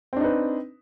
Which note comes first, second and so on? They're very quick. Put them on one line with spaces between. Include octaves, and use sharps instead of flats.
C4 D4 D#4 B4